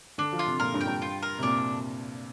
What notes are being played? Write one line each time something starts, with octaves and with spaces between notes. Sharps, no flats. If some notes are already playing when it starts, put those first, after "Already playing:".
D3 D4
F3
F4
C3
A#2 A#4
G2
G5
G2
F4
A#4
C3
A#2 D4